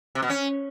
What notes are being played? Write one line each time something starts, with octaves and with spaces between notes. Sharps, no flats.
C3
B2
C#4